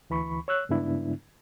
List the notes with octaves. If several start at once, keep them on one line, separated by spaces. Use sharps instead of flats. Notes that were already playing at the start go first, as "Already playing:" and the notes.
D2 E3 B5 C#6
C#5 E6 F#6
G2 C#3 G#3 B3 D4 E4